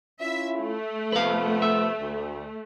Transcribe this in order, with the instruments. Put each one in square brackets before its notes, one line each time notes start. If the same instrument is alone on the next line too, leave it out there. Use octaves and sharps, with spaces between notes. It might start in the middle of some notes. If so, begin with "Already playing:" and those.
[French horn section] C#4 E4 F4 [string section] E5
[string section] A3
[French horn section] C3 F3 B3 [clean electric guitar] B4 F5
[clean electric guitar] E5
[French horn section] D2